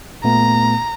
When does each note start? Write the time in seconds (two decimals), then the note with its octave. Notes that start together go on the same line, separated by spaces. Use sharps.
0.24 A#2 A3 B3 A#5